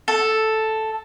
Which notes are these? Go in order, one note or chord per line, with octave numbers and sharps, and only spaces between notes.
A4